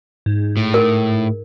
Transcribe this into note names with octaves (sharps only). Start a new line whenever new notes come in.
G#2
A2
A#4